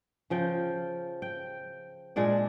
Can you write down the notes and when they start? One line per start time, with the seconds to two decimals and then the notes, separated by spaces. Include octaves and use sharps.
0.30 C#3 F3 G5
1.22 G5
2.16 A#2 G#3 D4 D5